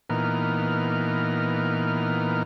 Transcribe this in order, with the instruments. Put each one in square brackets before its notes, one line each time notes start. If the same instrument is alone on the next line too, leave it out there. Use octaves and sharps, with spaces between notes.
[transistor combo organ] A#2 E3 B3 D#4 A#4 F6